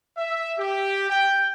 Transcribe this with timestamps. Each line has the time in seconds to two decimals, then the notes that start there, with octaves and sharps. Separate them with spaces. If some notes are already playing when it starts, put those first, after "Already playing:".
0.17 E5
0.57 G4
1.09 G5